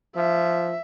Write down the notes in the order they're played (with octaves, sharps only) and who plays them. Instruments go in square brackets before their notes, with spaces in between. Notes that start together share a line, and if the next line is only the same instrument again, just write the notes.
[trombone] F3 [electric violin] E5